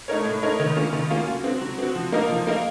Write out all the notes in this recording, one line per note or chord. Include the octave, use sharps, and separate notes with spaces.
A3 D#4 A#4 C#5
A2
A3 D#4 A#4 C#5
D#3
A#3 C#4 F4
D#3
A#3 C#4 F4
F#3
C4 F#4
F#3
C4 F#4
F3
A#3 D#4 A#4 F5
F3
A#3 D#4 A#4 F5